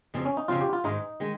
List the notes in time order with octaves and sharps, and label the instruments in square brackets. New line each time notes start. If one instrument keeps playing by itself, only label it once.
[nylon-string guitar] F2 C#3 F3 C4
[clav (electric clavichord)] C#4
D#4
[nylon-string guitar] F2 C#3 F3 C4 [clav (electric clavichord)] F4
[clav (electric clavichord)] G4
F4
[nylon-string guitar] G#2 D#3 G#3 [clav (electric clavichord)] D#4
[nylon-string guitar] D#3 G#3